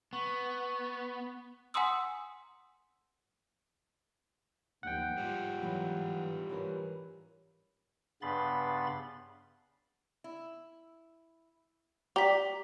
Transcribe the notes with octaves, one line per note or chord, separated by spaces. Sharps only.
B3 C#6
F#5 G#5 A#5 C6 D#6 E6
D#2 F3 F#5 G5
G#2 G3 F4
E3 F#3 B3
E3 C#4 A#4
G2 C#3 B3 B5 C6 A6
E4
G4 D5 A#5 B6